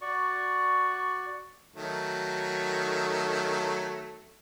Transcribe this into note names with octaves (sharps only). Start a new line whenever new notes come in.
F#4 D5 C#6
D#3 F#3 A3